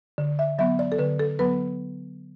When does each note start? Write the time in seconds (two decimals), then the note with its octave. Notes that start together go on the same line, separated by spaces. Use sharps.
0.18 D3
0.39 E5
0.59 F#3 B3 E5
0.79 D5
0.92 A4
0.99 D3 B4
1.19 A4
1.39 F#3 B3 B4